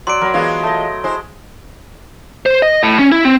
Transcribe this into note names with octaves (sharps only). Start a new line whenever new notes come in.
F#3 D5 C6 D7
F#3 A#4 B5
E3 G#3 B3 F4 C#5
A3 D#5
G#3 E4 C5
C5
D#5
A2
C#4
E4
C4